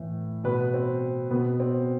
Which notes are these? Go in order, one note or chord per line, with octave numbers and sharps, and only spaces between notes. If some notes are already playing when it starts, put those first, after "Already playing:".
Already playing: A2 E3
B2 B4
C4
B2 B3
C4